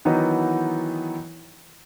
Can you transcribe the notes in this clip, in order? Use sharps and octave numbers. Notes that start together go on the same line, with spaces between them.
D#3 E3 F#3 B3 D#4